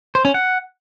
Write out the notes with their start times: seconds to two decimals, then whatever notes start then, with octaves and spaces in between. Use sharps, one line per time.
0.15 C5
0.25 C#4
0.34 F#5